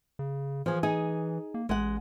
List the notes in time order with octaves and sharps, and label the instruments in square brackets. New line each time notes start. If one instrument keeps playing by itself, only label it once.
[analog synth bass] C#3
[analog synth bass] E3 [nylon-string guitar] F3 G#4
[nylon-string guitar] D#4 G#4
[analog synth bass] A#3
[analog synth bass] A1 [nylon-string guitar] G#3 F#5